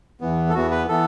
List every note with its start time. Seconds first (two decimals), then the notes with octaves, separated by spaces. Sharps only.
0.21 E2 E3 B3
0.50 A4
0.54 E2 E3 B3 F#4
0.71 B4
0.88 E3 B3 A4